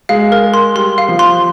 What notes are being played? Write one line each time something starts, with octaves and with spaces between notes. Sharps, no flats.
G#3 F5
A#4
C6
G3 C6
F5
F3
C6